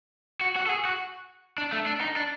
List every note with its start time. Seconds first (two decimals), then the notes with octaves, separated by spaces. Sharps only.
0.41 F#4
0.56 F#4
0.66 A4
0.70 G#4
0.85 F#4
1.58 D4
1.73 A3
1.86 D4
2.01 D#4
2.16 D4